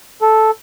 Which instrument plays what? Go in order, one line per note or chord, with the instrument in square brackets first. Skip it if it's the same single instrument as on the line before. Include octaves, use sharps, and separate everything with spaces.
[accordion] A4